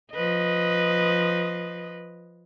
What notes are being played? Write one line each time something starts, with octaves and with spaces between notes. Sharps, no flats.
F3 B4 D#5